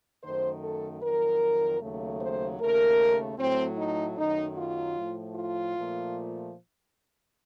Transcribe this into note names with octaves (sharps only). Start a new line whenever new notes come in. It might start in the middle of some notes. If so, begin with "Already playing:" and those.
F#2 D#3 A3 C5
A4
F2 D#3 F#3 A#4
D#2 C#3 F#3 A3
C5
D#2 C#3 A3 A#4
A2 F#3 A3 C4
D#4
F#2 D#3 F#3 A3 D#4
F4
A2 F3 A3
F4
A#2 F3 A3